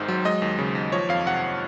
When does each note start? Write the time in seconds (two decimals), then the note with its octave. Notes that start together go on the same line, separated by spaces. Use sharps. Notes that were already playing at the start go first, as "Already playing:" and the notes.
Already playing: G#1 G#2 D#3 C5
0.08 F#3
0.25 G#3 D#5
0.42 D#2
0.59 C#3
0.75 D#2
0.92 F3 C#5
1.09 F2 F5
1.26 C3 F#5